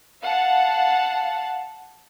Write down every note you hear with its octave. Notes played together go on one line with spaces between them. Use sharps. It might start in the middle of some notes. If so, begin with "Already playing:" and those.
F5 F#5 A5